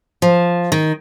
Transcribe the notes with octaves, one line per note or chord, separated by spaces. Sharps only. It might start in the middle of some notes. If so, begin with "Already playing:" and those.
F3
D#3